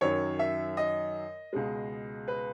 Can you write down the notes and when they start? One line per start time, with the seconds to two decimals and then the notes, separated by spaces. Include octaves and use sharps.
0.01 F#2 D#3 F#3 C#5
0.39 E5
0.77 D#5
1.53 C#2 B2 G#3
2.28 B4